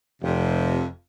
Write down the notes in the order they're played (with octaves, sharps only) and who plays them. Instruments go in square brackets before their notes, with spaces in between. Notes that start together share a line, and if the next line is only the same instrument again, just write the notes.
[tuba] F1 [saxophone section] F2 C3